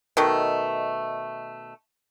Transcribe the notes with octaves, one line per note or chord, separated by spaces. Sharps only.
B2 D#3 A3